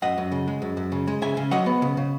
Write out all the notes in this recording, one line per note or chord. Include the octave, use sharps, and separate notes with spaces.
F#2 D#5 F#5
F#2
C#3
G#3
F#2
F#2
C#3
G#3
C#3 E5 G#5
C#3
F#3 D#5 F#5
B3
C#3
C#3